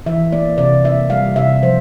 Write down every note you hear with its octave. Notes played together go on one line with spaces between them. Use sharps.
E3 E5
A#3 D5
C3 D5
A#3 E5
G3 F5
C3 E5
F3 C5